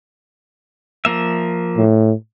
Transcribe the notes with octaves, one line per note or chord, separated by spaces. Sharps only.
F3 A#3 E5
A2